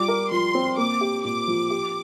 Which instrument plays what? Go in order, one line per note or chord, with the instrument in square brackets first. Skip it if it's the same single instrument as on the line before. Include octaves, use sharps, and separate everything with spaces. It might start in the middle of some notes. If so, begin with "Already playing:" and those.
Already playing: [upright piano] G3 F4 [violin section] D6
[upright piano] A#4
[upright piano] F3 [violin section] C6
[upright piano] C4
[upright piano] A#3 [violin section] D6
[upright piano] G4
[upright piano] A#2 [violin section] D6
[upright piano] F3
G4